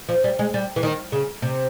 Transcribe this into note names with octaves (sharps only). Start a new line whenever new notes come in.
F3
G3
G#3
G3
E3
D#3
C#3
C3